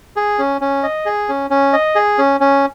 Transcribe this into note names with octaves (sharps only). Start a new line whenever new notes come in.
G#4
C#4
C#4
D#5
G#4
C#4
C#4
D#5
G#4
C#4
C#4